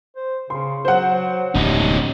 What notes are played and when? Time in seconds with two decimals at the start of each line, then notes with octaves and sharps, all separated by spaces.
0.16 C5
0.50 C#3 C6
0.85 F#3 C5 F#5
1.55 D1 F2 C3 C#4 D#4